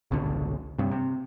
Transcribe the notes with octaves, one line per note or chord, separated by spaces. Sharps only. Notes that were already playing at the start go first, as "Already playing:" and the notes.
G#1 C#2 B2 D3
G2 C3
C3